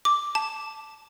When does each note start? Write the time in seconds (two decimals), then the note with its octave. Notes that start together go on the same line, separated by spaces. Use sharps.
0.05 D6
0.35 A5